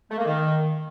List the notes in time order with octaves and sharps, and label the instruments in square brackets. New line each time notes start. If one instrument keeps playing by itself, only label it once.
[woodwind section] A3
A#3
D#3